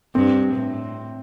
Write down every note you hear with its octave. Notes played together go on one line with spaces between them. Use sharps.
G2 C4
A2